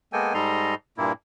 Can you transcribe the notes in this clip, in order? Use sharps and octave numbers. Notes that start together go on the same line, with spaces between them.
G#3 A#3 B3 A4 G5 G#5
G#2 G3 A4 D#5 A#5 C6
G2 A#2 A#3 E4